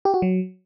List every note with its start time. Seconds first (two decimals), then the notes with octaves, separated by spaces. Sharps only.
0.05 G4
0.14 F#4
0.22 F#3